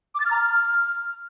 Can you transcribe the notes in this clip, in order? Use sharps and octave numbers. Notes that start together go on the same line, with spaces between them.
D6
A6
F6
A#5
F6